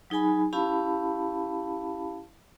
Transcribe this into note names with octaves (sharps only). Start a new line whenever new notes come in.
F#3 D#4 G#4 G#5 B5
C#4 E4 G4 F5 A5 B5